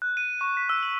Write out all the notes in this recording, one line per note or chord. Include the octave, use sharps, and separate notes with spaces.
F#6
D#7
C#6
B6
E6
F#7